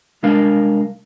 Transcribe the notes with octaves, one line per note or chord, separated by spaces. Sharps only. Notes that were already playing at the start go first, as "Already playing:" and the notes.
C2 G#3 D4 A#4 F5